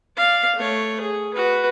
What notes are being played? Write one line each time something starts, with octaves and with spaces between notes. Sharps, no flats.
D5 F5
A3 C#5
G#4
F#4 B4